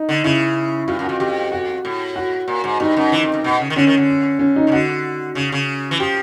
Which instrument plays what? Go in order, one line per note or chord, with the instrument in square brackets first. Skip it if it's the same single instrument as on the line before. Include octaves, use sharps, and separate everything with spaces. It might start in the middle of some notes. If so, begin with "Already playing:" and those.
Already playing: [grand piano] D#4
[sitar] D3
[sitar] C#3 [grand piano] E4
[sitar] G2 [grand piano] F4
[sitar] F#2
[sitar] F2 [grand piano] F#4
[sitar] F2 [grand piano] G4
[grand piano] F#4
[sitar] A2
[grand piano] F#4
[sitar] A#2
G#2
[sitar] G2 [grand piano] D#4
[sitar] F#2
E3
F2
F2
B2
C#3
D#3
[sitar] D3 [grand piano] C#4
[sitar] D#3
D3
[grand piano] C#4
D#4
[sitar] C#3
[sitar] D3 [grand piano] F#4
[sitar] C#3
C#3
E3
[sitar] F3 [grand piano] G4